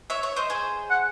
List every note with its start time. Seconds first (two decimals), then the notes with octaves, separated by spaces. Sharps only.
0.10 C#5 E5
0.23 C#5 E5
0.36 C5 D#5
0.50 G#4 C5
0.90 F#5